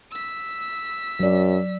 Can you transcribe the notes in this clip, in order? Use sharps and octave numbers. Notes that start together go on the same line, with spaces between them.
E6 B6
F#2 F#3 D5